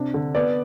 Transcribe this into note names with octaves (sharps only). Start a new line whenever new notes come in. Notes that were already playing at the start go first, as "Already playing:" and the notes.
Already playing: C3 D4
D3
B3 D5